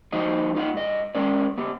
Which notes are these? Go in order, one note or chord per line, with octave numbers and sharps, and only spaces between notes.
F3 G3 D#4 F#4 C5 D#5
D#4 F4 C#5 D#5 F#5
G2 D#5
G#3 C#4 A#4 D5
B3 G4